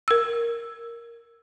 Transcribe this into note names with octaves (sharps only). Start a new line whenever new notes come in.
A#4 E6